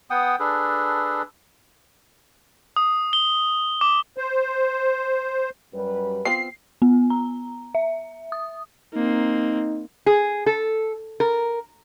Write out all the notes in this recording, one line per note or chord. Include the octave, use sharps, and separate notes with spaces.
B3 F#5 G5 D#6
D4 G#4 A4 B4
D#6
G7
D6
C5
F#2 G3 B4
B3 C4 F4 C7
B3
A#5
E5
D#6
A#3 C4 D#4
G#4
A4
A#4